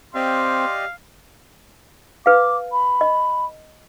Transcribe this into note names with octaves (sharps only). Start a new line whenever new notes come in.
C4 G4 D5 D#5 F5 C6
B4 F5 D6
B5
D#5